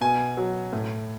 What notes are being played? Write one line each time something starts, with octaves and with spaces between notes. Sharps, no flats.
B2 G#5
F#3
A2